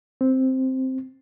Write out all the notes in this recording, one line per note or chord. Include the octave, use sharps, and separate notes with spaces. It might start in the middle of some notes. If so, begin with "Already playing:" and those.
C4